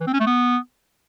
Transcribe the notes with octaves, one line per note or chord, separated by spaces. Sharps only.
E3
C4
C#4
A3
B3